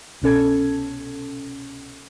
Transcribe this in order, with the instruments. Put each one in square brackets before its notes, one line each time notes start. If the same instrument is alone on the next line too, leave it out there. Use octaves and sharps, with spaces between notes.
[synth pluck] C2 B2 C#4 A4 G#6